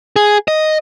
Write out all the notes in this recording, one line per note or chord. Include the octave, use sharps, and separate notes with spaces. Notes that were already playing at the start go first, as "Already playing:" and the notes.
G#4
D#5